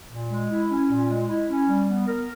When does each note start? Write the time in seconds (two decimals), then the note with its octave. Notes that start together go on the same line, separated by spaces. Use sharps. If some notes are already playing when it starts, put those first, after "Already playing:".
0.11 A#2
0.30 G#3
0.50 E4
0.70 C#4
0.90 A#2
1.09 G#3
1.29 E4
1.49 C#4
1.68 G3
1.88 B3
2.08 A#4